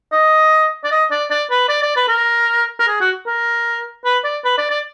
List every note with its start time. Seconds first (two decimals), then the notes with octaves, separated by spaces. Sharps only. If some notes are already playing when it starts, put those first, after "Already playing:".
0.12 D#5
0.84 D5
0.91 D#5
1.11 D5
1.30 D5
1.50 B4
1.69 D5
1.82 D5
1.96 B4
2.08 A#4
2.79 A#4
2.88 G#4
3.00 F#4
3.27 A#4
4.05 B4
4.24 D5
4.45 B4
4.58 D5
4.70 D5